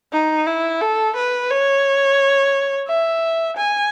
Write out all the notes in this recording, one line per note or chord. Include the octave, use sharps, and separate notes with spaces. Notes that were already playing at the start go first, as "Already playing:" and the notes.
D#4
E4
A4
B4
C#5
E5
G#5